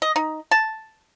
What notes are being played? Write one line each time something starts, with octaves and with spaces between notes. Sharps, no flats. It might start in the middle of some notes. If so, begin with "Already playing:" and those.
D#5
D#4
A5